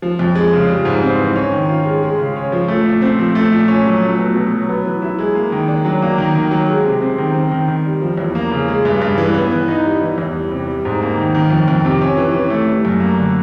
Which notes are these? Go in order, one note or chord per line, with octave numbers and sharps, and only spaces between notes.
F3
F2
G#3
C#3
G3
G#2
C4
E3
C#4
D#3
F4
G#3
G#3
C#3
C#4
F3
A3
A#2
C4
F3
A3
A#2
C#4
F#3
A3
B2
B2
F#3
B3
E3
E4
G#3
A#3
D#3
D4
F#3
A#3
D#3
D#3
F#3
G#3
C3
C4
D#3
C4
D#3
D#3
G3
F3
E2
A#3
C#3
G#3
G2
G2
E3
B3
E3
D#4
G3
E3
E2
G3
C3
G3
G#2
A#3
D#3
D#3
F2
F2
C3
C#4
E3
E3
A3
G3
F#2
A#3
D3